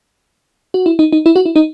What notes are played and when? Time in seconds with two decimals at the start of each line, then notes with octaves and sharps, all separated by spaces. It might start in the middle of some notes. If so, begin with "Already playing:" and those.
0.74 F#4
0.86 E4
0.99 D#4
1.13 D#4
1.26 E4
1.36 F#4
1.46 E4
1.56 D#4